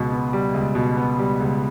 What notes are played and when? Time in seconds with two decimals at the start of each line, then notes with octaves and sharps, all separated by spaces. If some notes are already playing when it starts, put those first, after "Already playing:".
Already playing: C#2 B2
0.12 B3
0.33 G3
0.54 C#2
0.75 B2
0.97 B3
1.19 G3
1.40 C#2